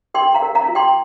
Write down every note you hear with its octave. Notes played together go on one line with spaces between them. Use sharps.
A#4 G5 C6
F5 A#5
A#4
F5 A#5
F4
G5 C6